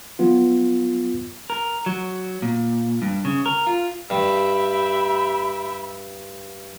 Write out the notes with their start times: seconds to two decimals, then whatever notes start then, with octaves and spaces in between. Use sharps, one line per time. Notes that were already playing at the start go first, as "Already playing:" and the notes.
0.19 F#3 B3 F4
1.50 A#4
1.86 F#3
2.42 A#2
3.02 G2
3.25 C#3
3.46 A#4
3.67 F4
4.10 G2 G4 E5 B5